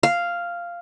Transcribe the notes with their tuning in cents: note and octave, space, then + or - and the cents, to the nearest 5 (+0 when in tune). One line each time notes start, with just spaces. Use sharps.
F5 -5